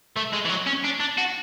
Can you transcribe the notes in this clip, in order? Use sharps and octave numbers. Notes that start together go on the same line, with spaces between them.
A3
G#3
E3
F#3
C#4
D4
D4
F#4